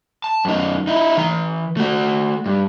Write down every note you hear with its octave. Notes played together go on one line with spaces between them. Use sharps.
A5
F#2 D#4
D#4 E4
E3 A#5
A3 F#4
G2